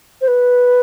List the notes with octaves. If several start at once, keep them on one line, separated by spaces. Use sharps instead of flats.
C5
B4